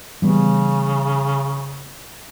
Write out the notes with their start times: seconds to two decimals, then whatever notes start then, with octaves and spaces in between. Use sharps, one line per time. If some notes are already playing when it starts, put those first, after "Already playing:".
0.22 C#3 E3 G3 B3